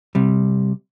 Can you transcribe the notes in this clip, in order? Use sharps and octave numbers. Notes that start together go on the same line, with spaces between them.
C3 G3